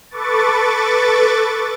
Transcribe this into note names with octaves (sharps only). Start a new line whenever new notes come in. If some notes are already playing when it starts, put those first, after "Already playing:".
A4 B4 C#6 D6 A6